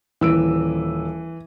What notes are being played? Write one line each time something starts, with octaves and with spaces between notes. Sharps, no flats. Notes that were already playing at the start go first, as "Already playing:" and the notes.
D#1 E3 E6 D7